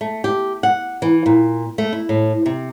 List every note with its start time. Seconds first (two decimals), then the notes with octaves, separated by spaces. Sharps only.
0.01 A3
0.24 G4
0.63 F#5
1.02 E3
1.26 A#2
1.78 A3
1.93 E4
2.09 A2
2.46 C3